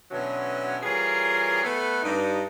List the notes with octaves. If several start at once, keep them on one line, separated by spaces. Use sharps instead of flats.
B2 D3 E3 F#3 C4 C#4
E3 G3 F4 G#4 A#4 C#5
A3 B3 A4 B4
G2 D#4